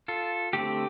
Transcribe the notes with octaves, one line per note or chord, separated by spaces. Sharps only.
F4 A4
D3 A3 C4 G4